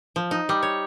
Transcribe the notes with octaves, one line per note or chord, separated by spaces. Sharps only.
F3
D#4
G3
C#5